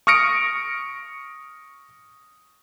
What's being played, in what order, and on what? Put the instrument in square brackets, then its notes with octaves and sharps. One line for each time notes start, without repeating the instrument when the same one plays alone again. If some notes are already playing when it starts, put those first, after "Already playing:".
[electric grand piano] C#6 D#6 F6 A#6 C#7 D7